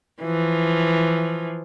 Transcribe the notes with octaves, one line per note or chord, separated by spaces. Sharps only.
E3 F3